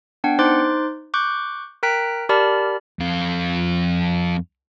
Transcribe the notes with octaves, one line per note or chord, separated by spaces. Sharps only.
B3 D4 F#5 G5
D#4 C5 C6 D6 F#6 A6
C#6 D6 F#6 G6
A#4 G5 A#5 F#6 B6 D7
G4 A#4 D5 A5 B5 F6
F2 F4